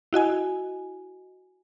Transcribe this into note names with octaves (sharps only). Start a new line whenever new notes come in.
E4 F#4 D#5 G#5